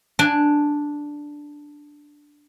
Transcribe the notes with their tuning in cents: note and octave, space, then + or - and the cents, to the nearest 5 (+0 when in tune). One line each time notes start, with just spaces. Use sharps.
D4 +0 G#5 -5